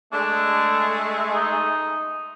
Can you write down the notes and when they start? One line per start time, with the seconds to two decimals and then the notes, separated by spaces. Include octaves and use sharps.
0.13 G#3 A3 D4
1.33 D#4